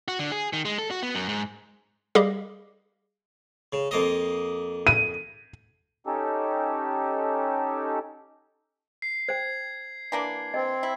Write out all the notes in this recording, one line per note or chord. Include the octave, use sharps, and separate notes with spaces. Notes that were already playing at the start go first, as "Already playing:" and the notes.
F#4
D3
G#4
D#3
G#3
A4
F#4
B3
F#2
G#2
G3 G4 G#4 D#5 F5
C#3
F2 A#3 D#5
D#7
C#4 D#4 G4 A4
C7
C5 G5 G#6
E3 A#3 D4
C4 D#5 G5
E4